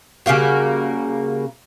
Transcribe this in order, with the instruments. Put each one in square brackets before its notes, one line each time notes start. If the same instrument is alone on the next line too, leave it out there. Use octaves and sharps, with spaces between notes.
[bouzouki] C#3 G3 A#3 F#4